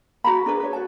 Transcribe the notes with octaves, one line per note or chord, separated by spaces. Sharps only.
F#4 A#5 B5
D4 G#4 B4
B4 C#5
F#4 A5